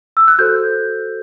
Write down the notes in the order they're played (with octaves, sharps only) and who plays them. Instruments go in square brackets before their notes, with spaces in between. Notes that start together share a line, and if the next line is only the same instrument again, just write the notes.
[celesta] E6
F#6
F#4 A4 C5 G6